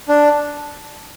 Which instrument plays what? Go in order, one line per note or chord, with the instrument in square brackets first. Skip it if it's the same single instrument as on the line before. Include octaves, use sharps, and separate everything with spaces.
[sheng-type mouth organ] D4